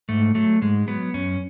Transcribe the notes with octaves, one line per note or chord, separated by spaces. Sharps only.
G#2 A3
F#3 A3
G#2 G#3
F#3 B3
F#2 C#4